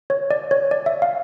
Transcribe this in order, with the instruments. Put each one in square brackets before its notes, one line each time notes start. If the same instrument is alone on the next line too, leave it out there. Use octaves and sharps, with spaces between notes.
[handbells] C#5
D5
C#5
D5
E5
F5